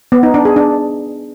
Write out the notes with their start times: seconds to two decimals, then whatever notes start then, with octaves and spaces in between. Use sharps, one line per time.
0.12 B3
0.23 D#4
0.34 D4
0.45 G#4
0.56 D4